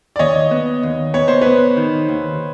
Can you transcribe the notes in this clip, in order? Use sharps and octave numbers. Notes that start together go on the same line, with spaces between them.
D5
D#2 C#5 D#5
B3
D#2
B3 C#5
C5
B3 B4 C#5
D#3
D#2